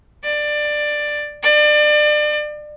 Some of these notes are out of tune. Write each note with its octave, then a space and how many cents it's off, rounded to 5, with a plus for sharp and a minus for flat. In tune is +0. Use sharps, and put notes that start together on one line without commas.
D5 +15
D5 +30